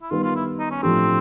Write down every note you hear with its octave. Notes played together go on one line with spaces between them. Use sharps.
E4
D#3 G3 B3 F4
F4
E4
D#4
C#4
A2 F3 A3 C4 D4 G4